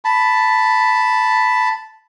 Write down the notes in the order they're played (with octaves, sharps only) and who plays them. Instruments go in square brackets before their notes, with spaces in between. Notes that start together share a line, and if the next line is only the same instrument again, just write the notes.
[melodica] A5 B5